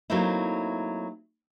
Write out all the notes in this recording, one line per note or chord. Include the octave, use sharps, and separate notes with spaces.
F#3 A3 A#3 C4 D#4 E4